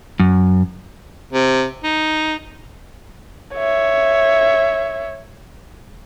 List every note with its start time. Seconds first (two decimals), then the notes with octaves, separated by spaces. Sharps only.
0.20 F#2
1.33 C3
1.84 D#4
3.55 C#5 E5